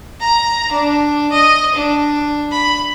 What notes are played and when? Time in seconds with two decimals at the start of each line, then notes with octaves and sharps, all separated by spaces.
0.20 A#5
0.72 D4
1.32 D#5
1.75 D4
2.51 B5